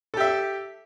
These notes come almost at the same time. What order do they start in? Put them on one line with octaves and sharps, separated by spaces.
A4 G4 E5